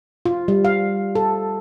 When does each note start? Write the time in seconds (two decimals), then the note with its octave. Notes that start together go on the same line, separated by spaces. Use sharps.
0.26 F4
0.48 G3
0.65 F5
1.15 A4